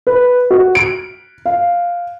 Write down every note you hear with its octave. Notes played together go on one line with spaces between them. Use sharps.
B4
F#4
D7
F5